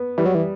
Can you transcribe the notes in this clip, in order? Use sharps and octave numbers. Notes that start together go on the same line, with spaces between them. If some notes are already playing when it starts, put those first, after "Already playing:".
Already playing: B3
E3 G3
F#3
E3